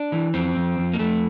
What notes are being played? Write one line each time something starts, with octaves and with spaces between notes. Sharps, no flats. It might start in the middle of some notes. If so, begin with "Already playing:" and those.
Already playing: D4
E3
F2 C4
F2
F2
A#3
F2 A3